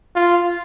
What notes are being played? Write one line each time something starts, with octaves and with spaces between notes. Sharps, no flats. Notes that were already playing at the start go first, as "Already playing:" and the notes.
F4